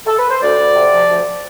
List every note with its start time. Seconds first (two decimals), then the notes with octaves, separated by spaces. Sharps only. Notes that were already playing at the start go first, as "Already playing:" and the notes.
0.07 A4
0.19 B4
0.30 C5
0.42 D2 D5
0.59 D2
0.75 C3
0.92 F3
1.09 D2